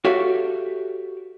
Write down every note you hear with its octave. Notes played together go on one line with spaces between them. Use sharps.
F#4 G4 A4 C#5 E5 F5